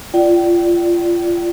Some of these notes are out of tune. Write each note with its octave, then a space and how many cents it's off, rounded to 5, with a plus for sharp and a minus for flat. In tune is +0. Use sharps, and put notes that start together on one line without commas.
F4 -25 D5 +0 G5 -35